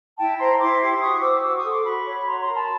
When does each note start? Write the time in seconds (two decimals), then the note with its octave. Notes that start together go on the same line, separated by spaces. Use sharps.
0.17 E4 G5 A5
0.38 C5 A#5 C6
0.59 E4 C6 D6
0.80 G4
1.01 F#4 C#6 D#6
1.21 C5 D6 E6
1.42 F#4 D6 E6
1.57 C#6 D#6
1.63 A4
1.71 C6 D6
1.84 F#4 B5 C#6
2.05 C#5
2.26 F#4 A#5 C6
2.40 A#5 C6
2.47 A#4
2.54 A5 B5